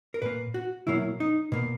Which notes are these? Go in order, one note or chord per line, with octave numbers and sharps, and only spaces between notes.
A#4
A#2 A#3 B4
F#4
B2 F#3 A#3 E4
D#4
B2 A#3